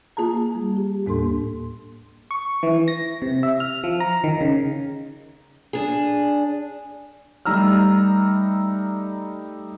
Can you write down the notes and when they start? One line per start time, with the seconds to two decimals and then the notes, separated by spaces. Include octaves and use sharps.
0.17 A#3 F4 G#4 A5 A#5
0.55 G3
0.77 G4
1.06 D#2 A2 A#3 D4 A4 C6
2.31 C#6
2.63 E3
2.88 A#6
3.22 C3
3.43 E5
3.60 F6
3.84 F3
4.00 A#5
4.24 D#3
4.41 C#3
5.73 D4 G#4
7.45 G3 A3 D#4 A#5 E6 F6